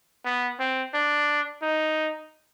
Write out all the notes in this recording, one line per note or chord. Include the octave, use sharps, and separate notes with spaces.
B3
C4
D4
D#4